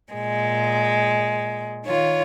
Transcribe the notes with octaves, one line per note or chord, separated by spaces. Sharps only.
A#2 G#3
D#3 F4 C#5